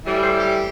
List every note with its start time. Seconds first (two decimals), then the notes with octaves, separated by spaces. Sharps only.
0.05 A2 E3 G3
0.22 C5
0.39 G4